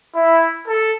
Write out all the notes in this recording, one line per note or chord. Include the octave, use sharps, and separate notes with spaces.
E4
A4